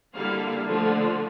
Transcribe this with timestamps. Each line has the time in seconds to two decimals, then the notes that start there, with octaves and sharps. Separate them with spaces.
0.14 D3 G3 A#3 E4 F5
0.67 D3 F3 A3